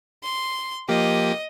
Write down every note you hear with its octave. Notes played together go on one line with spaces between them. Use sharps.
C6
F3 A#3 G4 D#5